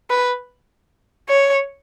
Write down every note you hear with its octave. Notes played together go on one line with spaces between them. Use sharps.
B4
C#5